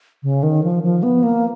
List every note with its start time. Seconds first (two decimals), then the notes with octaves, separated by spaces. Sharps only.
0.23 C#3
0.43 D#3
0.63 F3
0.83 F3
1.03 B3
1.23 A#3